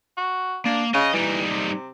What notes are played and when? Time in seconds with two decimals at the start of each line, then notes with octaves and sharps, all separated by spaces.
0.17 F#4
0.65 A#3 D4
0.94 C#3 D#5
1.13 E3 G3 D#4
1.50 C3